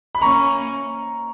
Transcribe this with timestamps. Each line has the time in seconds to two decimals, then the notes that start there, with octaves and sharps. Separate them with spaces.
0.15 B5
0.21 A#3 C#4 A#5 C#6